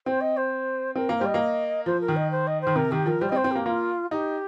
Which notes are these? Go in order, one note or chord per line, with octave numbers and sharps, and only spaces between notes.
C4 C5
D#5
C5
C4 A#4
A#3
C5
G3
D#5
A#3
F3 C5
A#4
D#3
D#5
C5
D#5
C5
D#3
C3 A#4
D#3 G4
F3 A#4
G3 C5
D#5
C4
C5
C4
A#3 G4
A#3 F4
D#4 G4